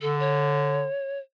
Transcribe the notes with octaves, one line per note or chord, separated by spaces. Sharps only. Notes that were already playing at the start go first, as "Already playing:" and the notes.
D3 A4
C#5